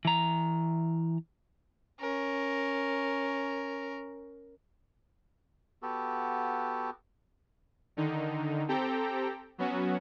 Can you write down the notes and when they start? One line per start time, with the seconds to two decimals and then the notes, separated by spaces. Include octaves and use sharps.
0.05 E3 A#5
2.00 C#4 A#4
5.82 B3 F#4 G4 A4
7.97 D3 D#3 D#4
8.68 C4 G4 A4 G5 A#5
9.58 F#3 B3 C#4 F#4